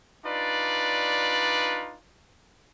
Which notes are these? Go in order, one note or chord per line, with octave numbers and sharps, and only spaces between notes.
D4 D#4 F4 B4 D5